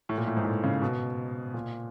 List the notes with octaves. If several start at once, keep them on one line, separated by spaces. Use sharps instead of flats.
A2
A#2
A2
G#2
A2
C#3
B2
A#2